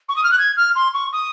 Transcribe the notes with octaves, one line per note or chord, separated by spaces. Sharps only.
C#6
D#6
F6
F#6
G#6
F6
C6
C#6
D#6